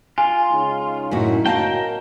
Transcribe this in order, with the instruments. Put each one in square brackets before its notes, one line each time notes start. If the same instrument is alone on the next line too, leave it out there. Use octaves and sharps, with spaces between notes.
[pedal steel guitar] F4 [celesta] G#5
[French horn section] C#3 G#3 D#4
[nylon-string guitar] F#2 A2 F#4
[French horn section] C#3 F#4 [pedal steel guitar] A#4 G5 [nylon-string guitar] D#5 F5 A5